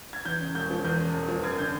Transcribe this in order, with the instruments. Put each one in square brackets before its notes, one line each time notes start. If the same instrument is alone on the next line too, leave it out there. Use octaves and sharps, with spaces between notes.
[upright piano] G#6
E2 G6
C#3
E1 G6
F3
E2 G6
C#3
E1
F3
F#2 G#6
D3 G6